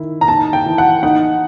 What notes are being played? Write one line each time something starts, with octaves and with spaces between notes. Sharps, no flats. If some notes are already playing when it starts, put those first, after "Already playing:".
Already playing: D#3 E4
A#5
D#4 A5
G5
E3
F#5
D#4 F#5